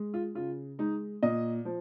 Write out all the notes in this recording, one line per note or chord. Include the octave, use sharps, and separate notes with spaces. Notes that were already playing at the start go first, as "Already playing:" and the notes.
Already playing: G#3
F4
C#3 F4
G#3 D#4
A#2 D#5
F3